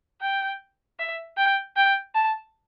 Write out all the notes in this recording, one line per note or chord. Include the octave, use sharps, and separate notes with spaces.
G5
E5
G5
G5
A5